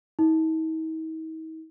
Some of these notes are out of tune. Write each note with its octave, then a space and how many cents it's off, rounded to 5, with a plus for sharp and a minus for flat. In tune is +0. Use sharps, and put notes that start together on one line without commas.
D#4 +45